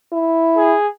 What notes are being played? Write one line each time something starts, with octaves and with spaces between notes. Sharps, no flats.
E4
G#4